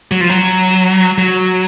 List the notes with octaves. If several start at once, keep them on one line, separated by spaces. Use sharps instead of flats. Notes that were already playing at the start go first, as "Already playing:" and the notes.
F#3
F3
F#3
F#3